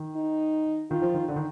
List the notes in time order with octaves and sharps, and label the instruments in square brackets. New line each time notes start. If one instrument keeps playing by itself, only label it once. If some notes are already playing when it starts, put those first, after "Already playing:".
Already playing: [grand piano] D#3
[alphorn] D#4
[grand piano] D#3 [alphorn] F4
[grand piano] F3
D#3
D3
D#3